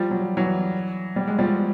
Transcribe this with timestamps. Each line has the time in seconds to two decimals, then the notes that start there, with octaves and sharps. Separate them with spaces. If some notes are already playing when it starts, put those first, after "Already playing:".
Already playing: F3 G3
0.11 F#3
0.24 F3
0.37 E3 F#3
1.16 G3
1.27 G#3
1.38 F3 G3